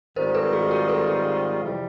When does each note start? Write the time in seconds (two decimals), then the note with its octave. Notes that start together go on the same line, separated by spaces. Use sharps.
0.16 G#2 D#3 G3 C4 F4 A#4 C5
0.35 A4 B4
0.53 F#4 G#4
0.71 G#4 A#4
0.89 A4 B4
1.07 G#4 A#4
1.61 F2 C3 E3 G3